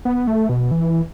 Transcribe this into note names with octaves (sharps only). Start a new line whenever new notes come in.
B3
A3
B2
E3